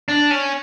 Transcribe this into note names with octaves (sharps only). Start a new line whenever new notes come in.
D4
C#4